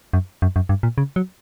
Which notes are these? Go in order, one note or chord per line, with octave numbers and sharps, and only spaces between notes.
F#2
F#2
F#2
G2
A#2
C#3
F#3